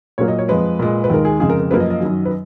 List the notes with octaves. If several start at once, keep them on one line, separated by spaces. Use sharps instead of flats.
A#2 F#3 A#3 C#5
D#5
C#5
F2 F3 G#3 B4
A#2 G#3
B4
D#2 D#3 G#3 A#4
G#4
F2 C#3 G#3 G#4
A#4
A#4
F#2 F3 A#3 B4
D#5
D#5
F#2 D#3 F#3
B4